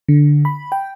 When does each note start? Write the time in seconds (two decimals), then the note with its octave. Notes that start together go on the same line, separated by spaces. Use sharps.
0.08 D3
0.45 B5
0.72 G5